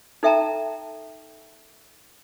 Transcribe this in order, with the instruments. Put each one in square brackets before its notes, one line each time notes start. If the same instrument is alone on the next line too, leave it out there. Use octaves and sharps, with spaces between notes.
[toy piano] D#4 A4 E5 G5 A5 A#5